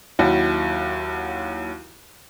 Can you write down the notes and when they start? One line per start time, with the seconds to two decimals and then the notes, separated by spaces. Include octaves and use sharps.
0.19 D#2 F#3 E4 F#4